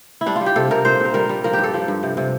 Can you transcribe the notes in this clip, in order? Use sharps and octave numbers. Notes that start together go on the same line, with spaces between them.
E4
G3 D4
F4
G3
G4
C3 A4
C3 A#4
A#2 C5
A#2 A#4
G3 A#4
G3
F3 A#4
G2 G4
A4
F3
G2
C3
C3